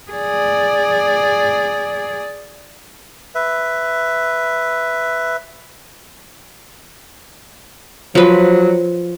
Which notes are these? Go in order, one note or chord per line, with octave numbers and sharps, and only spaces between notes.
G#4 D5
B4 E5
F3 F#3 B4